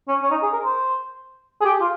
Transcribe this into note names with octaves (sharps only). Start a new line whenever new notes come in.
C#4
C#4
D#4
G#4
A#4
C5
G#4
G4
F4